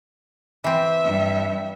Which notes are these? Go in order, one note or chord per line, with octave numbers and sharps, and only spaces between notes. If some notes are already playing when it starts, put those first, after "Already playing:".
E3 C4 E5
G2